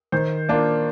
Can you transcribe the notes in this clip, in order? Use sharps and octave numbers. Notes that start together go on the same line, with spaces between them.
D#3 C5
A#3 D4 F4